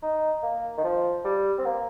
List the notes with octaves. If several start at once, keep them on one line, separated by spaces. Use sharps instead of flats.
D#4
A#3
D#3
F3
G3
C4
A#3